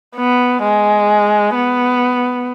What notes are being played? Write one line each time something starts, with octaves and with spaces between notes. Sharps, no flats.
B3
G#3
B3